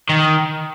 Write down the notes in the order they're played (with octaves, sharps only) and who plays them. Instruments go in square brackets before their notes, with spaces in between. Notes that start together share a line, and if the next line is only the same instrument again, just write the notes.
[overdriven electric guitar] D#3